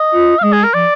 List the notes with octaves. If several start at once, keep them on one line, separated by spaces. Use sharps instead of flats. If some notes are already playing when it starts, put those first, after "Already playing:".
Already playing: D#5
F4
F5
G#3 D#5
G#4
A#4
F3 D5